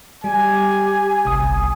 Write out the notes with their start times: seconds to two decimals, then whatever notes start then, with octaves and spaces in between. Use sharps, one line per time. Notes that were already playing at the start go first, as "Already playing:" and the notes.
0.24 G3 G4 G#5
1.25 G1 C2 D#6